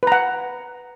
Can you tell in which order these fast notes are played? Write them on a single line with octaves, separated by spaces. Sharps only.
B4 A#5 F#5